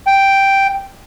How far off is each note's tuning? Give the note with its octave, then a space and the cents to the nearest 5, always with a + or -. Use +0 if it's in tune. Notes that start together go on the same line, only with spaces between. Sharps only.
G5 +0